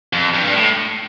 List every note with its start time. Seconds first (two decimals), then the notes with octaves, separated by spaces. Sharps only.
0.13 F2
0.34 G2
0.44 G2
0.54 A2